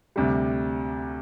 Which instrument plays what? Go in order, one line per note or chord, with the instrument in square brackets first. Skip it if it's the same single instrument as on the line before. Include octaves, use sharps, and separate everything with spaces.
[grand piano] D2 C3 G3